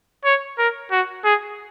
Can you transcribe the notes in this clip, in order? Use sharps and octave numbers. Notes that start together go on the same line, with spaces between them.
C#5
A#4
F#4
G#4